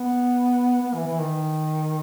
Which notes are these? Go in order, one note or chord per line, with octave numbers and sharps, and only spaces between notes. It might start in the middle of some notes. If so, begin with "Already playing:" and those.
Already playing: B3
B3
E3
E3
D#3